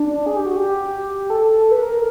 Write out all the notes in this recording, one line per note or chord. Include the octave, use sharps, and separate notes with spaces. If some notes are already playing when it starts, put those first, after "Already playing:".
Already playing: D4
G#4
G4
F#4
G4
A4
B4
A#4